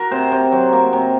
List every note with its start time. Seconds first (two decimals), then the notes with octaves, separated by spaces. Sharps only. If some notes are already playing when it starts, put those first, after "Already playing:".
Already playing: F#4 A#4
0.11 C3 C5
0.32 C3
0.52 F#3
0.73 A#3
0.93 C3